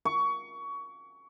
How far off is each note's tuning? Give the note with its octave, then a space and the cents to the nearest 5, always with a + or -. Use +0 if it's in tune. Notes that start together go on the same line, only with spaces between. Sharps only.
C#6 +20